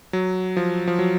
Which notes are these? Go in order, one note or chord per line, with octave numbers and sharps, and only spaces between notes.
F#3
F3
F3
F#3